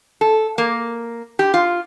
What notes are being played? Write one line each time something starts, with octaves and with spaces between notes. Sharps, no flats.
A4
A#3
G4
F4